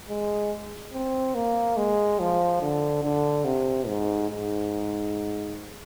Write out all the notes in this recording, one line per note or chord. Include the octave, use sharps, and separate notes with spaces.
G#3
C4
A#3
G#3
F3
D3
D3
C3
G#2
G#2